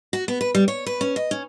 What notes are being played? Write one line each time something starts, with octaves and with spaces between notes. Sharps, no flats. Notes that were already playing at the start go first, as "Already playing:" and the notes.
F#4
B3
B4
G3
C#5
B4
C#4
D#5
C#4